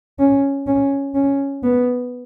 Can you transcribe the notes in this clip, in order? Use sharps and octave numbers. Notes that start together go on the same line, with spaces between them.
C#4
C#4
C#4
B3